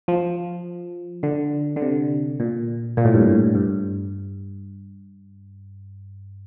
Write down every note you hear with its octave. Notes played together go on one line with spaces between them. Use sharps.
F3
D3
D3
C3
A#2
A#2
A2
G2
A2
G2